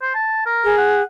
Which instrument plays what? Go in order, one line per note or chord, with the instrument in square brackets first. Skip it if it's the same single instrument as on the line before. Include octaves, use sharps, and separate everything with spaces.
[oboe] C5
A5
A#4
[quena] G#4
[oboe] F#5